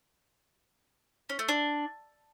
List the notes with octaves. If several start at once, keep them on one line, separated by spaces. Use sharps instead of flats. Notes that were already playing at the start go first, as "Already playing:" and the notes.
C#4
A3
D4